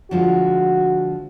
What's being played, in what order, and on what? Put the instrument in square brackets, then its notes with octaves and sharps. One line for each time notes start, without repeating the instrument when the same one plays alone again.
[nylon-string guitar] D3 F3 G#3 [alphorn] F#4